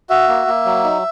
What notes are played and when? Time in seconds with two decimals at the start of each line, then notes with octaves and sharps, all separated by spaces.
0.10 F#4 E5
0.28 A#3
0.47 A#3
0.65 F#3
0.84 D#4